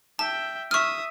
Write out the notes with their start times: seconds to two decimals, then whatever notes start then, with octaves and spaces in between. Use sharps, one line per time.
0.19 E5 G5 A5
0.71 E5 C#6 D#6 F6